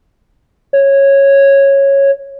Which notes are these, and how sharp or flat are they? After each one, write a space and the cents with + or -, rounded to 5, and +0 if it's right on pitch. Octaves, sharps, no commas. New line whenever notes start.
C#5 -10